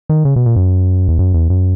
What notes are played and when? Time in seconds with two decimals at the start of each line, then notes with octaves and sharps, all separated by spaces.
0.09 D#3
0.25 C#3
0.36 B2
0.46 A#2
0.56 F#2
1.08 E2
1.19 F#2
1.34 E2
1.50 F#2